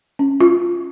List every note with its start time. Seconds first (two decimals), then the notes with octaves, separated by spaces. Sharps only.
0.19 C#4
0.41 F4